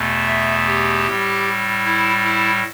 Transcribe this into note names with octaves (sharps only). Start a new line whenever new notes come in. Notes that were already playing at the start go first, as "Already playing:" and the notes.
Already playing: E2 B2 A3
E5
G4
A2 G3
E4
E4